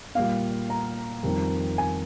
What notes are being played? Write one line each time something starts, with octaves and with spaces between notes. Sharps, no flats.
A#2 G3 F5
A#5
F2 D#3 G3
G#5